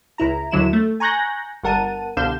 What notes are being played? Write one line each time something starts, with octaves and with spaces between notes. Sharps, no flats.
C#2 E4 A#5
D#2 D3 F#3 E4 E7
A3
G#5 A#5 C#6 F#6 G6 A#6
G1 G2 A#4 F#5 A5 D#7
C2 B2 D3 F5 G6 E7